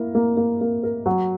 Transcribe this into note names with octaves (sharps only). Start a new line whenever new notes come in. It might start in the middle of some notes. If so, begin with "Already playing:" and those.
Already playing: A#3 E4
A#3
A#3
A#3
A#4
F#3